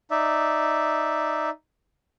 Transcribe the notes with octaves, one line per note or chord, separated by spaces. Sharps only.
D#4 D5 E5